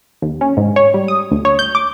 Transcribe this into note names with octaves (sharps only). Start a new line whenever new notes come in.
D#2
C#4
G#2
C#5
G3
D#6
D2
C#5
G6
D6